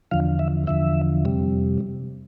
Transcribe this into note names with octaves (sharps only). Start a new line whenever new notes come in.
E2 D3 F3 F5
E5
E2 D3 F3 E5
F2 C3 G3